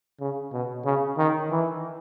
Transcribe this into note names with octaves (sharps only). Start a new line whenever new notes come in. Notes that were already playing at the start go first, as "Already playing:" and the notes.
C#3
B2
C#3
D#3
E3